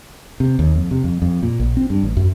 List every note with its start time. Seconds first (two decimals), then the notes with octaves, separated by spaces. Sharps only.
0.40 C3
0.59 D#2
0.76 F2
0.91 C3
1.04 F2
1.22 F2
1.43 A#2
1.60 A#1
1.77 C4
1.90 G2
2.03 A1
2.17 F#2